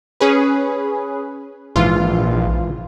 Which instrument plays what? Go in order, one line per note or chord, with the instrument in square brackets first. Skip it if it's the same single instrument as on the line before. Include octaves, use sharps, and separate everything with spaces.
[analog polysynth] C#4 G#4 B4
[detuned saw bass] A#1 [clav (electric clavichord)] G#2 E3 [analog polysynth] F4